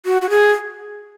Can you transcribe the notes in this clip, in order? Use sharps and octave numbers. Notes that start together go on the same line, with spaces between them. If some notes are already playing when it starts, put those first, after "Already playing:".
F#4
F#4
G#4